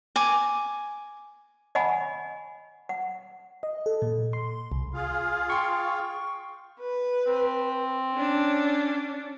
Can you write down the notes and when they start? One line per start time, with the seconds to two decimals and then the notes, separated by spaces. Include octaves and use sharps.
0.16 G#5 D6
1.75 D#5 F#5 G#5 B5
2.89 F#5
3.63 D#5
3.86 A4
4.02 A#2
4.33 C6
4.72 C2
4.93 F4 G#4 F5
5.50 G5 C6 C#6
6.80 B4
7.27 C4
8.14 C#4 D4